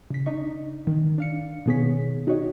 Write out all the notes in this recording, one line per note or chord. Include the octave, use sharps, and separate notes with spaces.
C#3 B6
D4 D#4 D#5 C#6
D#3
D4 F5 C#7
B2 D#3 B3 G#4 C#5 B6
D#4 F#4 G4 C#5 D#5